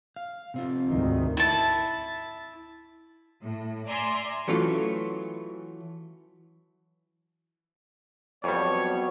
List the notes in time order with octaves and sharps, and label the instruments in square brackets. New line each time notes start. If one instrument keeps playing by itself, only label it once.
[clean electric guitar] F5
C3 C4 F4
[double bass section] D2 G#2 D#3
[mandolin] E4 A5
[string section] A2
D5 E5 G#5 A#5 C6
[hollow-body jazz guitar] E3 F#3 A3 C#4 F4
[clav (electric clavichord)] F2 G3 [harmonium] F#3 B3 [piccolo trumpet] C#5